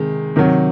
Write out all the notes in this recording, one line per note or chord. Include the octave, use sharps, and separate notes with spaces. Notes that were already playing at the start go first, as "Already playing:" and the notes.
Already playing: C3 D#3 G#3
C3 D#3 F#3